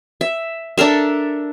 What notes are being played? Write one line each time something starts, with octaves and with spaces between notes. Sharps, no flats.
E5
D4 A4 A#4 E5